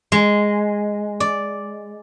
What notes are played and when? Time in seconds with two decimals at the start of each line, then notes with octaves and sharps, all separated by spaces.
0.12 G#3
1.20 D5